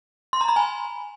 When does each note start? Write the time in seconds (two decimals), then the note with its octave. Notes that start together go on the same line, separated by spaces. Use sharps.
0.33 C6
0.41 A#5
0.49 B5
0.56 G#5